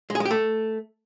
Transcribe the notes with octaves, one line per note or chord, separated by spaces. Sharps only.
G#3
G#4
G#3
G4
A3